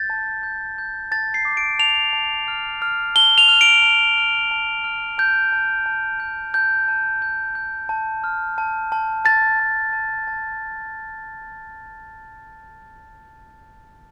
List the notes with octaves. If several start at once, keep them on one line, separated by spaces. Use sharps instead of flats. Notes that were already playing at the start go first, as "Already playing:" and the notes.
Already playing: G6 A6
A5
G6
G6
A5 A6
C7
D6
D7
A5 F7
A5
F6
F6
A5 G7
F7
F6
D7
A5
F6
A5
F6
A5 G6
A5
A5
G6
A5 G6
A5
G6
G6
A5
F6
A5
A5
A5 A6
A5
A5
A5